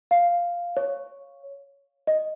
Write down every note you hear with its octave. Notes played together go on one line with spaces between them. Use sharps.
F5
C#5
D#5